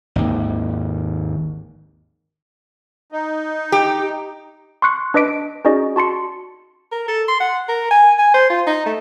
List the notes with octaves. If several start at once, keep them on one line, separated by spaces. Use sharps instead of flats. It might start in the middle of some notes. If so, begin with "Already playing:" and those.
G#1 D#2
D#4
G4
C6 C#6 F#6 C#7
D4 B4 D#5 D6 B6 D7
C#4 D#4 F#4 G#4 D5 D#5
F#4 A5 C6 C#7
A#4
A4
C6
F#5
A#4
G#5
G#5
C5
F4
D#4
A3